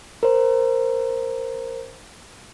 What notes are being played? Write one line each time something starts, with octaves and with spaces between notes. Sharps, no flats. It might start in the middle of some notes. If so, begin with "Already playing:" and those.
A#4 C5